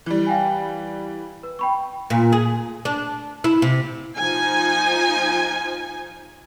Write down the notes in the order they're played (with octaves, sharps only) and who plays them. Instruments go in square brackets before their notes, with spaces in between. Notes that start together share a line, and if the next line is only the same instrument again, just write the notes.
[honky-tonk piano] E3 G3
[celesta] F5 G5 G#5
B4
G5 B5 C#6
[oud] A#2
G#4
D4
E4
C3
[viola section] F3 D#4 G#5